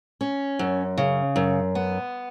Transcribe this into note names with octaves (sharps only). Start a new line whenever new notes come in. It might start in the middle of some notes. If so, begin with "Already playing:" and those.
C#4
F#2
C#3
F#2
B3